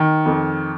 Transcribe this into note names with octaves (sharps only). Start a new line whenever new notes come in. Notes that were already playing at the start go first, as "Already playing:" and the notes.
Already playing: D#3
F2